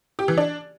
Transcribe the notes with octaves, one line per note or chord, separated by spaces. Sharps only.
G4
E3
D4